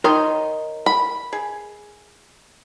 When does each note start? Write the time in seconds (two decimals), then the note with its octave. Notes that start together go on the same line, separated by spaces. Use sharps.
0.04 D#3 D#4 A#4 C#5 D#5 C6
0.86 B5
1.33 G#4